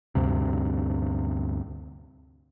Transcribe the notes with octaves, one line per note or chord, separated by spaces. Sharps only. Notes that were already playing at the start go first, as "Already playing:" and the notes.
D2 G2 C3